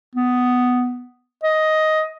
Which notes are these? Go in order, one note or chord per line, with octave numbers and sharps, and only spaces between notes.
B3
D#5